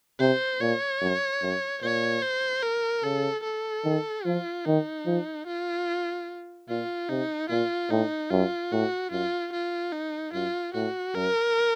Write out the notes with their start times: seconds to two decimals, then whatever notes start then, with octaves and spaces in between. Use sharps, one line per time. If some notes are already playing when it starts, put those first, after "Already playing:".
0.20 C3 C5
0.61 A#2 C#5
1.01 F#2
1.42 F#2
1.82 A#2 C#5
2.22 C5
2.63 A#4
3.03 C#3 A4
3.44 A4
3.85 D#3
4.25 F3 F4
4.65 D#3 D#4
5.06 F3
5.47 F4
6.69 A#2 F4
7.09 C3 D#4
7.50 A#2 F4
7.90 A2 D#4
8.31 F#2 F4
8.72 A2 F#4
9.12 F#2 F4
9.53 F4
9.93 D#4
10.34 F#2 F4
10.74 A2 F#4
11.15 F#2 A#4